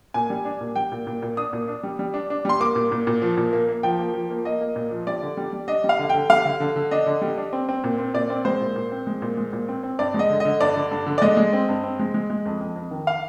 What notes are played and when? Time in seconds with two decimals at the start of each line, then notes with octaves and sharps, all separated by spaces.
0.14 A#2 G#5
0.30 G3
0.45 D4
0.61 A#2
0.76 G3 G5
0.92 A#2
1.07 A#2
1.22 A#2
1.37 D4 D#6
1.53 A#2
1.68 D4
1.83 G3
1.99 G3
2.14 D4
2.30 D4
2.45 G3 C6
2.60 A#3 D6
2.76 A#2
2.92 A#2
3.07 A#2
3.22 F3
3.37 A#2
3.53 A#3
3.68 A#3
3.83 F3 G5
3.99 A#3
4.14 F3
4.30 A#3
4.45 A#3 D#5
4.61 A#3
4.76 A#2
4.91 F3
5.07 G3 D5
5.22 D3
5.37 G3
5.53 G3
5.68 D4 D#5
5.84 G3
5.89 F5
5.99 D3
6.10 D3 G5
6.30 G3 F5
6.45 D3
6.60 D3
6.76 D3
6.91 D4 D#5
7.06 D3
7.22 G3
7.37 D4
7.53 C4
7.69 C4
7.84 A#2
7.98 C4
8.14 A#2 D5
8.30 C4
8.45 G#3 C5
8.60 A#2
8.76 A#2
8.92 C4
9.07 G#3
9.22 A#2
9.37 G#3
9.53 A#2
9.68 C4
9.83 C4
9.99 G2 D5
10.14 G#3
10.19 D#5
10.30 D3
10.40 D3 D#5
10.61 G2 D5
10.76 D3
10.91 G2
11.07 D3
11.18 D5
11.22 G#3 D#5
11.37 G#3
11.53 C4
11.69 G2
11.84 C4
11.99 G#3
12.14 G#3
12.30 G#3
12.45 F2
12.61 F2
12.76 F2
12.91 D#3
13.07 F5